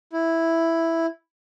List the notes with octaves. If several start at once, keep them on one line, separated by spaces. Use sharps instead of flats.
E4